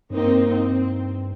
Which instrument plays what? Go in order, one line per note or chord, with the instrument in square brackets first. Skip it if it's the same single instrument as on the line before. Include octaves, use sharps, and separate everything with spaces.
[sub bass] G2 [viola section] A#3 C4 D#4
[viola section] C4